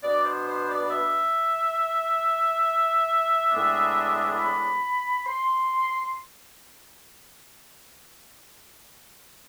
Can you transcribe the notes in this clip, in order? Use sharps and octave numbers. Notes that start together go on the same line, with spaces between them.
B2 B3 D4 D5
C5
C5
D5
E5
A2 G#3 B3 D4
B5
C6